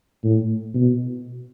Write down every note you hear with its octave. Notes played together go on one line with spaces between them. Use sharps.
A2
B2